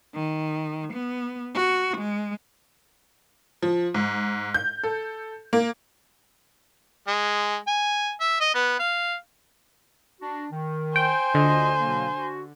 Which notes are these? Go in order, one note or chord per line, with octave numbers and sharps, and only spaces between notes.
D#3
B3
F#4
G#3
F3
G#2
G6
A4
A#3
G#3
G#5
E5
D#5
B3
F5
D4 F#4
D#3
C5 G5 G#5
D2 D3 F4 D#5
B2 F#3 A#3
F#4